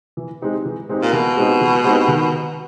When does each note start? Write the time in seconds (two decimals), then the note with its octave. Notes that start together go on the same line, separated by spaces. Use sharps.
0.17 E3
0.42 G#3 C4 D#4 G4
0.65 E3
0.89 G#3 C4 D#4 G4
1.02 A#2
1.12 B2 E3
1.36 G#3 C4 D#4 G4
1.61 E3
1.84 G#3 C4 D#4 G4
2.08 D#3